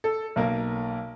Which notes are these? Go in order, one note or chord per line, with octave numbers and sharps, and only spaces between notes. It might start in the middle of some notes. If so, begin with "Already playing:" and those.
A4
B1 A#3 A#4